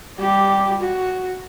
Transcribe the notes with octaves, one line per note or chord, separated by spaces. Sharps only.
G3 G4
F#4